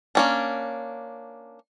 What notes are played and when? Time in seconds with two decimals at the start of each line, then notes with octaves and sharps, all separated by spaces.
0.15 A#3 C#4 D4